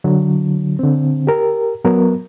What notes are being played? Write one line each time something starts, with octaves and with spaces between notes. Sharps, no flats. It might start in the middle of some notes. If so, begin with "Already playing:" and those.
D3 F#3
D3 C4
G4 A#4
F#3 B3 A#4